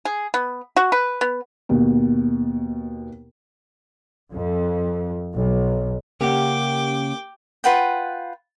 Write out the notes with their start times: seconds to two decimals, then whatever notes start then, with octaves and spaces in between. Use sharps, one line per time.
0.05 G#4
0.34 B3
0.76 F#4
0.92 B4
1.21 B3
1.69 D#2 B2
4.30 F2
5.36 B1
6.21 C#3 A#3 C#4 G4 A#4 F#5 G5 D6
7.64 F4 B4 F#5 G5